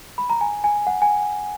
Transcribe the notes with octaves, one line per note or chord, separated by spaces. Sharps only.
B5
A#5
G#5
G#5
F#5
G#5